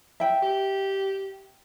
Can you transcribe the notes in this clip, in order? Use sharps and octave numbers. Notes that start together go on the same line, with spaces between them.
E5 G5
G4